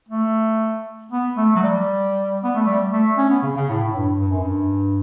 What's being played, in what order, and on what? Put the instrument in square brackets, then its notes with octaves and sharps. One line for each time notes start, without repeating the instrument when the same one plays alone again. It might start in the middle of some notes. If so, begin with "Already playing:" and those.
[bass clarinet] A3
B3
A3
F#3
G3
B3
A3
G3
A3
C#4
B3
C#3
C#3
A2
A2
G2
G2
F#2
G2